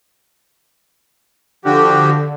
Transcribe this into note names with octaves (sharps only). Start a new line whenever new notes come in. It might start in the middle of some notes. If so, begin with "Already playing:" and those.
D3 F3 F#4 G4